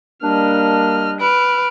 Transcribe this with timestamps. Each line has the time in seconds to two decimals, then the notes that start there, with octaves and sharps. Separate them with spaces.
0.23 G3 A#3 D4 D#5 F6
1.20 B4 F6 D7